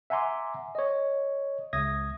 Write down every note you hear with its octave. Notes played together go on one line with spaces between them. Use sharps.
E5 F#5 G#5 A#5 C6 D6
C#5 D#5
C#2 E5 D#6 G#6 A#6